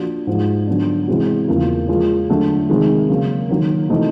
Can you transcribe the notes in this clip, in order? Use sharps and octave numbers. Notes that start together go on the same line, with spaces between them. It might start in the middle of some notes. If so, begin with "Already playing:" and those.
Already playing: F3 A#3 D4 F#4
G#2 F3 G#3
D3 F#3 B3 D4
C3 E3 G#3 C#4 F#4
E2 C#3 F3 A#3
F3 G#3 C#4 F4
D3 F#3 A3
C3 D#3 G#3
C#3 F#3 A#3
D#3 F#3 A#3
C3 E3 A3 C4 D#4